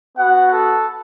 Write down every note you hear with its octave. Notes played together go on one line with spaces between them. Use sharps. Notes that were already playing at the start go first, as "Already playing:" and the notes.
B3 F#4 F#5
A4